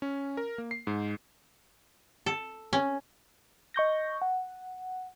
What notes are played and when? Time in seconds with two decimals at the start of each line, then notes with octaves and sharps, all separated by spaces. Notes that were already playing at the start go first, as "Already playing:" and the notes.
0.02 C#4
0.37 A#4
0.58 A#3
0.71 C7
0.87 G#2
2.26 A4
2.73 C#4
3.74 D#5 C#6 G6 A#6
4.22 F#5